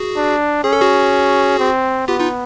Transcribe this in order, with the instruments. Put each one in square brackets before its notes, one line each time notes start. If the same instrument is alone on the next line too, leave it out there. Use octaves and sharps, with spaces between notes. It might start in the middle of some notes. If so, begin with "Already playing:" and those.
Already playing: [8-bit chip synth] F#4 G#4
[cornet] D4
[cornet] C#4 [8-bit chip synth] G#4
[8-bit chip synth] A4
F#4 G#4
[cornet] C4
[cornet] B3 [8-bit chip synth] F4 G4
[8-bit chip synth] D#4 F4